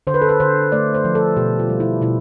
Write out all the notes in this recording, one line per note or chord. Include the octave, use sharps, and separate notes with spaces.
D3 C5
B4
A4
B4
D3 C5
A3 D5
C5
F3
A4
B2 G4
F4
G3
E4
B2 E4